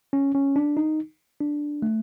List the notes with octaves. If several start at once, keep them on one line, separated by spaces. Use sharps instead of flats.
C#4
C#4
D4
D#4
D4
A3